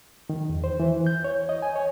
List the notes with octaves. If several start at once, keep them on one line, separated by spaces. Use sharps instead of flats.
D#3
E2
C5
E3
G6
C#5
D#5
G#5
C#5